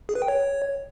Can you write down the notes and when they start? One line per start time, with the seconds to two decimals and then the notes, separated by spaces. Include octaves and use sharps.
0.09 G#4
0.15 B4
0.22 G5
0.28 C#5